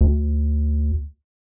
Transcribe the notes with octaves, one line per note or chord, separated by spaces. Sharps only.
D2